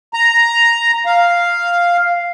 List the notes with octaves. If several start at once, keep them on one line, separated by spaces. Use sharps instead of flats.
A#5
F5